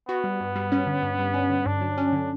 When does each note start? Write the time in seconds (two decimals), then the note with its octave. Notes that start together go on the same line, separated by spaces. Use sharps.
0.09 B3 F#4
0.24 G3
0.40 G2
0.56 G3
0.72 C#4
0.87 D3
1.03 G2
1.19 G3
1.34 C#4
1.50 D3
1.66 G2 D4
1.81 F#3
1.98 C#4
2.12 D3